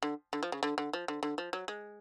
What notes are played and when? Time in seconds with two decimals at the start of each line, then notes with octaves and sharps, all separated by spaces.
0.03 D3
0.33 D3
0.43 F3
0.52 C#3
0.63 D3
0.78 D3
0.93 F3
1.08 D3
1.23 D3
1.38 F3
1.53 F#3
1.68 G#3